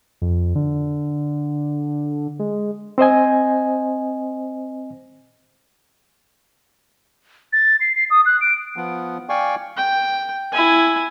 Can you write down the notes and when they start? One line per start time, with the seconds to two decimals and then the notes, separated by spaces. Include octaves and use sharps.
0.22 F2
0.55 D3
2.39 G#3
2.98 C4 C5 D#5 G#5
7.53 A6
7.81 C7
7.95 C7
8.11 D#6
8.26 F#6
8.41 D7
8.76 F3 B3
9.29 D5 F5 G5 G#5 C#6
9.77 G5
10.53 E4 G#5